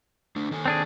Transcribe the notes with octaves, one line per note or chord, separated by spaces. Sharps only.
A3 D4
D#3 A4 G#5
C4 D4 G#4